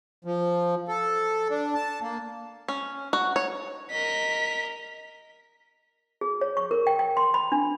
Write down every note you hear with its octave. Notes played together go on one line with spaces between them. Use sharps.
F3
A4
D4
A5
A#3
C#4
F#4
C#5
A#4 D#5 B6
G#4
C#5
C#6
A#4
G5
G5
C6
B5
D4